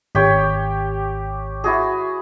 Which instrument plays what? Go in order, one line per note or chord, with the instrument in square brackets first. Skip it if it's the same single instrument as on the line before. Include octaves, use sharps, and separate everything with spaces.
[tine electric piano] G#1 [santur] G4 C#5 G5
[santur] E4 F#4 G#4